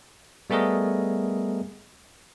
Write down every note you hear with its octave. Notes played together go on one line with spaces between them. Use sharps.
G3 A3 B3 G#4 A#4 D#5